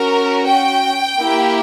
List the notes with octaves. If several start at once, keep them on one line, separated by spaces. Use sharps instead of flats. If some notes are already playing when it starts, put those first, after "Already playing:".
Already playing: C#4 F#4 A#4
G5
A#3 E4 G4